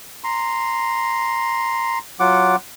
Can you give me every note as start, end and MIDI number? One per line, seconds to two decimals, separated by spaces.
0.24 1.99 82
0.24 1.99 84
2.20 2.56 54
2.20 2.56 65
2.20 2.56 78
2.20 2.56 86